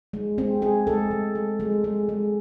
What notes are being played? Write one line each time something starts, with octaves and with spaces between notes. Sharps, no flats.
G#3
G#3 C4
G#3 G#4
G#3 A4
G#3
G#3
G#3
G#3
G#3